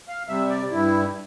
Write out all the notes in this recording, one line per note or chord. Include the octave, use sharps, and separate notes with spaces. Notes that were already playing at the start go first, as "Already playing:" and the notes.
F5
C3 G3 E5
D5
G2 E4